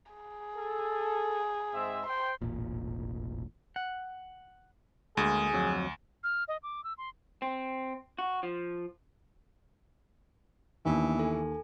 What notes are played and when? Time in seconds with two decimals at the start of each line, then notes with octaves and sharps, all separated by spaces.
0.12 G#4
0.56 A4
1.74 G#2 C4 E5
2.06 C5 G5 C6
2.42 E1 A1 A#2
3.76 F#5
5.17 D2 G#3 A#3 G#4
5.53 F2 F#3
6.24 F6
6.48 D#5
6.63 D6
6.84 E6
6.98 C6
7.42 C4
8.19 F#4
8.43 F3
10.86 D#2 E3 A#3 B3 D4
11.19 A4 G#5